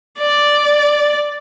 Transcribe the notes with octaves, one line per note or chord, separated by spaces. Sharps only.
D5